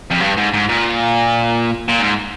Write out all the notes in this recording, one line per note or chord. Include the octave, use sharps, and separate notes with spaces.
F2
G2
G#2
G#2
A#2
A#2
G#2